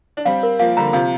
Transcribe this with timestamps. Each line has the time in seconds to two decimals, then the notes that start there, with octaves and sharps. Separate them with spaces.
0.17 D4
0.25 G3 C4 F5
0.43 A#4
0.59 F3 A#3 F5
0.77 D3 G3 A#5
0.93 C3 F3 F5